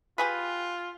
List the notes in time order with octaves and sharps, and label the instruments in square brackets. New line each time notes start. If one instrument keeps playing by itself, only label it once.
[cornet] F4 [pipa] G4 G#4 B4